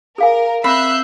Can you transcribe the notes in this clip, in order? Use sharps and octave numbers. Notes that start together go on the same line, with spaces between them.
G#4 A#4 F5 G#5
C4 E5 B5 E6 F#6 G6 C7